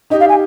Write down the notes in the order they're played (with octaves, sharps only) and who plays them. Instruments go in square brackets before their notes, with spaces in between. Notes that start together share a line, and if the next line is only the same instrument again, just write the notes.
[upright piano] D#4 G4 [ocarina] D#5
[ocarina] F5
G#5